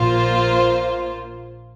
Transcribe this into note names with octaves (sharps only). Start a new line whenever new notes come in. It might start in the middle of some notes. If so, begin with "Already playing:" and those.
Already playing: A#1 A#2 A#3 F4 C5